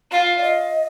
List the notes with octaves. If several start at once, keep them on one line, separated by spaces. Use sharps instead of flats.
F4 F5
D5
D#5